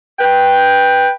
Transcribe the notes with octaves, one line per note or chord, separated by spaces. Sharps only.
B4 G5